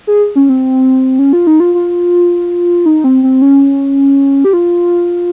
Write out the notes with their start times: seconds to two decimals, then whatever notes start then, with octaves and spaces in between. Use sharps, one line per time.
0.07 G#4
0.36 C#4
0.49 C4
1.19 C#4
1.33 F4
1.47 D#4
1.60 F4
1.74 F4
2.86 D#4
3.04 C4
3.23 C4
3.42 C#4
4.44 G4
4.53 F4